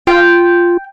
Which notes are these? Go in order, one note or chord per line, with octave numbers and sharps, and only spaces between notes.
F4 G5